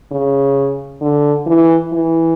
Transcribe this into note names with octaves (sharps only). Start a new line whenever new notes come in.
C#3
D3
E3
E3